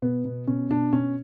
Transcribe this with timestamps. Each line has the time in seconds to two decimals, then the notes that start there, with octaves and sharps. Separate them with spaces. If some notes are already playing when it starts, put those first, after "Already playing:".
0.02 B2 B3
0.25 B2
0.47 B2 C#4
0.70 B2 D4
0.92 B2 C#4